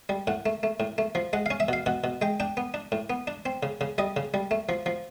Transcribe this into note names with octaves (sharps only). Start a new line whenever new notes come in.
G3
A2 F#5
A3
A3
A2
A3
F3
G#3 F#5
C#4 F5
E5
B2 F5
B2 F#5
B2
G#3 G5
D4 G5
B3
D4
A2
B3
D4
C4
C#3
C#3
G3 D#5
C#3
G3
A3
F3
F3